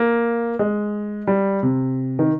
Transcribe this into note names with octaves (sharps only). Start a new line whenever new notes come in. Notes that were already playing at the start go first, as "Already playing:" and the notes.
Already playing: A#3
G#3
G3
C3
D#3